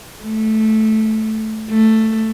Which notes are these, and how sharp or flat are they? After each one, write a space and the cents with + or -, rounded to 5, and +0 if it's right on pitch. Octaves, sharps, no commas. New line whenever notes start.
A3 -10
A3 +5